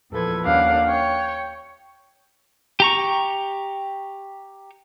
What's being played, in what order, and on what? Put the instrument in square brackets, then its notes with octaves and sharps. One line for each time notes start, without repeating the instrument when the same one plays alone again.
[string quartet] E2 A#2 F3 A4 B4 G#6
D#2 A#3 C#4 D4 F5 F#5
C#5 G5
[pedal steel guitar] G4 A#5 C#6